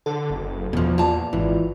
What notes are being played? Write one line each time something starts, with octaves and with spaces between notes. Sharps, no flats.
D3 A4
F#1
E2 B2 F3
A#2 F4 D5 A5
G#1 E3